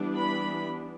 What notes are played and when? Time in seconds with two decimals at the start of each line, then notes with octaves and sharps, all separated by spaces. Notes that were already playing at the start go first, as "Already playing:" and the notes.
Already playing: E3 G3 B3 D4
0.15 B5